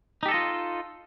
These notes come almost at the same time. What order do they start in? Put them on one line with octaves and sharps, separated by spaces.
D#4 G4 A4 D#5 F4